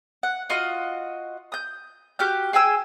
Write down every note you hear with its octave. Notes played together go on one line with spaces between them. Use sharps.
F#5
F4 F#4 D#5
D#6 G6
F#4 G4 F6 G6
G#4 G5 G#5 E6